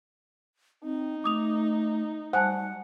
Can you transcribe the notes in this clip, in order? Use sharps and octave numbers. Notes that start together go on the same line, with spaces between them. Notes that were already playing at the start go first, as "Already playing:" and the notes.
C4 D#4
A3 D6 D#6 F7
G3 C5 F#5 G#5 A5